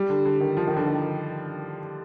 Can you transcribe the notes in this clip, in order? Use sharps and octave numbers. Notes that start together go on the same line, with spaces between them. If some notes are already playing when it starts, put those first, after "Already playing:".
Already playing: G3
D3
D3
D#3
F3
D#3
D3
D#3